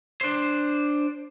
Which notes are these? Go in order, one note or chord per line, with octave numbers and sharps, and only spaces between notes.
D4 C5